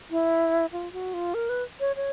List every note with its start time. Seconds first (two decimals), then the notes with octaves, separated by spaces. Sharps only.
0.11 E4
0.72 F4
0.93 F#4
1.14 F4
1.34 A#4
1.49 B4
1.80 C#5
1.96 C#5